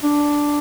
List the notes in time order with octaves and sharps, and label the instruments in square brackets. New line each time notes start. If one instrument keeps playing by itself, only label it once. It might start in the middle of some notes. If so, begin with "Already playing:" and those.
[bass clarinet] D4